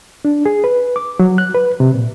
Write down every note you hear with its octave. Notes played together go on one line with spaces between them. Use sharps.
D4
G#4
B4
D6
F#3
F#6
B4
C3
A#2